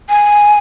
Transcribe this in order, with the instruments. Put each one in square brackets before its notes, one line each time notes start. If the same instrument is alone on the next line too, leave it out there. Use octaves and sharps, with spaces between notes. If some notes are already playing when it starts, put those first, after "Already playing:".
[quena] G#5